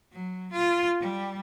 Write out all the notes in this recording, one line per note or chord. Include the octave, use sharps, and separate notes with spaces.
F#3
F4
G3